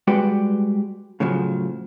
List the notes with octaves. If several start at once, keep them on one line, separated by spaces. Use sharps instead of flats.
G3 G#3 F#4 G4 B4 D5
A2 C#3 F3 F#3